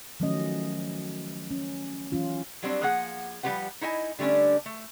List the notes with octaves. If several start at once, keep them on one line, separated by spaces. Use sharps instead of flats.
D#3 F3 F#3 A3 C#4 D#5
C#4
E3 F#3 C#4 F4
F#3 G3 C4 D4
F3 A#3 G#4 F#5
F3 G3 F4 G4 B4 F#5
D#4 E4 D#5 G#5
D3 G3 A3 C#4 D4
A3